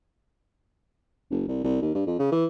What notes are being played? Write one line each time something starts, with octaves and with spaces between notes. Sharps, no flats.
F#1
C2
C2
D#2
G2
F2
C#3
E3